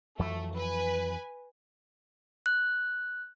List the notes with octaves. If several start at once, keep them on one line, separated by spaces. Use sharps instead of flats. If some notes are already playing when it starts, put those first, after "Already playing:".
F2 E3 F#3 A3
B4 G#5
F#6